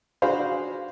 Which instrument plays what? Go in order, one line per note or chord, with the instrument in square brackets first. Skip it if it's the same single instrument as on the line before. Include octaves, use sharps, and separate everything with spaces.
[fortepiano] D4 F#4 G#4 C5 F5 B5